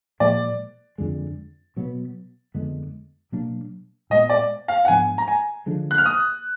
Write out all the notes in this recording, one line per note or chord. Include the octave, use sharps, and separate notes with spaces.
A#2 F3 G#3 D5
F2 D3 G#3
B2 F#3 B3
F2 D3 G#3 B3
B2 F#3 A#3 D4
A#2 G#3 B3 D#5
D5
F5
F#5
G#2 F3 B3 D4 G#5
A#5
G#5
D3 F3 G#3 D4
F#6
F6
D#6